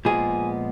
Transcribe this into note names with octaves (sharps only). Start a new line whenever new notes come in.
A#2 F3 G#3 B3 G#4